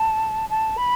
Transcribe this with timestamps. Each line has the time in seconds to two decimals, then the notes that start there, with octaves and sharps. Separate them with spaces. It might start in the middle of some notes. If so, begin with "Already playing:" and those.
Already playing: A5
0.50 A5
0.77 B5